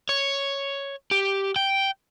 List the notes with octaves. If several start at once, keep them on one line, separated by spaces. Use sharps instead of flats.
C#5
G4
G5